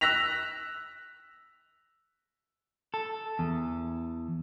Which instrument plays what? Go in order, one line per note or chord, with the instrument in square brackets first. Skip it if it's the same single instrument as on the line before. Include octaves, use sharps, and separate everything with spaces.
[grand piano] E6 F#6 A#6 B6 F7
[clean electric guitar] A4
E2